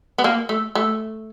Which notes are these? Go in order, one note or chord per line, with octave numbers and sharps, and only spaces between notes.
B3
A#3
A3
A3